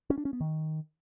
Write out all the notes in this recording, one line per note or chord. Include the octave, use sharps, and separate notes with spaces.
C#4
D4
C#4
B3
D#3